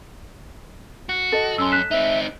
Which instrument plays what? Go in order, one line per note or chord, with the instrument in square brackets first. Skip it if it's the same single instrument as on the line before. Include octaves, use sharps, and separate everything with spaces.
[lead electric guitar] F#4
[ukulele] A4 D#5
[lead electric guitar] F#2 [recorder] C#4 [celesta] C6 E6
[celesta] F#6 B6 E7
[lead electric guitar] C4 D#4 [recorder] E5